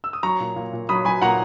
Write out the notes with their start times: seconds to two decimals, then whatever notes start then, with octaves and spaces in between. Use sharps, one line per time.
0.04 E6
0.13 D#6
0.23 F#3 A#5 C#6
0.40 A#2
0.56 A#2
0.73 A#2
0.89 F#3 B5 D#6
1.05 F#3 G#5 B5
1.22 A#2 F#5 A#5